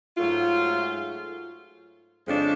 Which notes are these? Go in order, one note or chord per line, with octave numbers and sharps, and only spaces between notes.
G#2 F#3 A3 F4
F2 C#3 G#3 D4